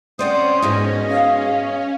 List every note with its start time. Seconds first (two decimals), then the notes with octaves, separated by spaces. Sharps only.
0.19 C4 C#4 C5 D5 F#5 D#6
0.62 G#2 B2 G#3 D#5
1.10 F5